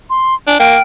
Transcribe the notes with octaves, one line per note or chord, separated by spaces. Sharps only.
C6
D4 G#5
A#3 G5 F6